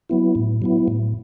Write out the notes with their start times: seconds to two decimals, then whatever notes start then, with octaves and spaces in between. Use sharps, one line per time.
0.09 F#3 B3 E4
0.35 A2
0.62 F#3 B3 E4
0.88 A2